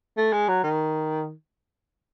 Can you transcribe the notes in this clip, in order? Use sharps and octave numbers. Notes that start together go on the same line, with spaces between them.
A3
G#3
F#3
D#3